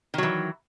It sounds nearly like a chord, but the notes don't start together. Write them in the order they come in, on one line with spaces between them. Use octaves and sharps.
D#3 F#3 E3